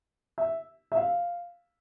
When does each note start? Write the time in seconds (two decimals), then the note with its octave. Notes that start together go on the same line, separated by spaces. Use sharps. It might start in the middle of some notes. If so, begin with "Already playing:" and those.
0.38 E5
0.92 E5
0.97 F5